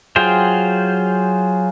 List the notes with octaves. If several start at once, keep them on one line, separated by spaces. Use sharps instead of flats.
F#3 F4 G#4 C5 G5